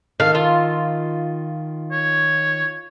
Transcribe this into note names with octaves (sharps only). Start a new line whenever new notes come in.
D#3 A4 F5
F4
C#5